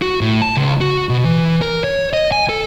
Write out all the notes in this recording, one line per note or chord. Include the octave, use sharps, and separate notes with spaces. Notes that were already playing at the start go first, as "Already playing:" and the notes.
F#4
A2
A5
C#2
F#4
B2
E3
A#4
C#5
D#5
G#5
A4